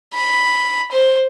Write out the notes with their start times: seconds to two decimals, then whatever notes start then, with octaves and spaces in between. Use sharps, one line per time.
0.14 B5
0.92 C5